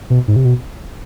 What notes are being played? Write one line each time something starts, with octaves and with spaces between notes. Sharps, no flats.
B2
G#2
C3
B2